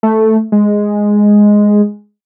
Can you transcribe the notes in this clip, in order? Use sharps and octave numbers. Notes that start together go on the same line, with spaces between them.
A3
G#3